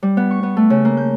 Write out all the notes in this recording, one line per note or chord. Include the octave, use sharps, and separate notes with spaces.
G3
B3
C#6
B3
A3
C#3
A#3
G6